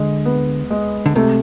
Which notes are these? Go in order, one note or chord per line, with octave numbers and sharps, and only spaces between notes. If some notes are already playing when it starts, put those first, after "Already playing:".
Already playing: D3 G#3
B3
G#3
D3
C3 A3